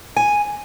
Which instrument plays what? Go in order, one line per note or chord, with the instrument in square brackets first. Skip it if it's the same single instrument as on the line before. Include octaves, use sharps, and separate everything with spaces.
[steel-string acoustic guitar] G#5